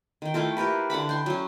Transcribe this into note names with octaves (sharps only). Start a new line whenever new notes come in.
D#3 G5
A3 E4 F4 A4
A#3 G4 A#4 B4
D3 F#5 A5 B5
G5 C6 C#6
F#3 C#4